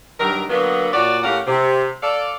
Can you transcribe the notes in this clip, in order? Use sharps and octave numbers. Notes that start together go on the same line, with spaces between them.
G2 D#3 F#3 A#4
D3 F#3 A#3 B3
A#2 F#4 C#5 D5
A2 C#4 G4 A#4 F5 F#5
C3
A4 D5 F5